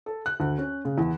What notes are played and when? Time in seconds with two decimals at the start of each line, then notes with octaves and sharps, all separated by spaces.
0.06 A4
0.26 F#6
0.40 D2
0.58 C#4
0.85 C#3
0.98 E2